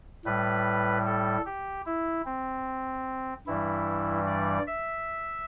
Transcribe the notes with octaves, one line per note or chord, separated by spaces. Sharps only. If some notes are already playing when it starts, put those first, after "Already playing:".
A2 G3 B4
A4
G4
E4
C4
G2 E3 G3 E4
D5
E5